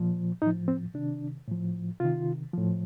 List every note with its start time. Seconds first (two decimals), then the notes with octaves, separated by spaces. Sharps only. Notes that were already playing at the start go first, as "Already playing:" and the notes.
Already playing: A#2 F3
0.42 A2 F3 D#4
0.68 C4
0.94 C3 D#3 D4
1.48 A2 F3
2.00 C3 D#3 F4
2.53 A2 F3